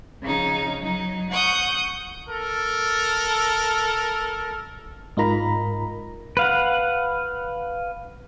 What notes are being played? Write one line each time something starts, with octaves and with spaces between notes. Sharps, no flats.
C#3 F3 D#4
F#3 D#4
F#5 C#6 D#6 G6
A4 A#4
G#2 D#4 F4 A#4 A#5 B5
B4 F5 F#5